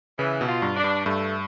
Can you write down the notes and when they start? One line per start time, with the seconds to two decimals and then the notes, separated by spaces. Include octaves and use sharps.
0.19 C#3 E3
0.41 B2
0.47 F4
0.62 G2
0.76 D4
0.84 G2
1.05 G2 A3